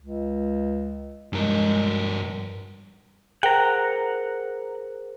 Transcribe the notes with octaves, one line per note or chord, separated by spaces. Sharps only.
C#2
G2 G#3 A#4
G#4 A#4 C5 F#5 G5 A#5